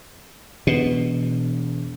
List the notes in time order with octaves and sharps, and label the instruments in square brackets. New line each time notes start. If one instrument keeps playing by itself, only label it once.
[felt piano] E1 [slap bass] B2